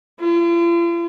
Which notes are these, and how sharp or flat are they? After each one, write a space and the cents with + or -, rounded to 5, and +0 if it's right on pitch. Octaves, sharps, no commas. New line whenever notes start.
F4 -45